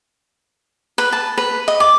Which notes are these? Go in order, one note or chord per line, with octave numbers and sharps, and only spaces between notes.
B4
A5
B4
D#5
D6